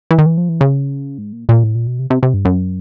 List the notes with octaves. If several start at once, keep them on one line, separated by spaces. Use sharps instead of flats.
E3
D#3
E3
F3
E3
C#3
G#2
A#2
A#2
A2
A#2
B2
C3
C3
C3
G2
F#2